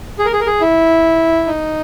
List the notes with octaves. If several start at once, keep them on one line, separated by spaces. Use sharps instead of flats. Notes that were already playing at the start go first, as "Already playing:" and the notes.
G#4
A#4
G#4
A#4
G#4
E4
D#4